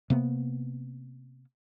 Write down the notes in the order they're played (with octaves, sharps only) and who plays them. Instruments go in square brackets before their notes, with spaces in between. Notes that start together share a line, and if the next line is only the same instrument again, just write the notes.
[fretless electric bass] C3 A#3 B3